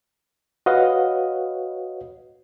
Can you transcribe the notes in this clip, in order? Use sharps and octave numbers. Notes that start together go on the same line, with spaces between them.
F#4 B4 C#5 D#5 F5 F#5